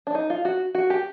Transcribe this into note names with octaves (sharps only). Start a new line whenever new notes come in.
D4
D#4
F4
F#4
F#4
G4